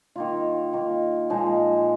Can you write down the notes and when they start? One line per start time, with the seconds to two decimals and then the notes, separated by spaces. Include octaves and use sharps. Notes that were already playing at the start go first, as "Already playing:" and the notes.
0.16 D#3 A#3 F4
0.73 D#3 A#3 F4
1.30 A#2 F3 G#3 D#4